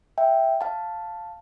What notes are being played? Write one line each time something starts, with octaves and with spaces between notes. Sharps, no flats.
E5 G5
F5 A5